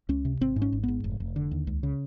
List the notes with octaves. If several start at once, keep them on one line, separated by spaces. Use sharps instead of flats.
C#2 C#4
C3
G#1 C4
G#2
C#4
G#1
G#2 B3
F1
F1
D3
D#2
C#2
C#3